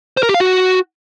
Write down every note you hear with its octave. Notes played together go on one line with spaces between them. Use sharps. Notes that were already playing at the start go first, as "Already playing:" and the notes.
C5
A#4
G4
F5
F#4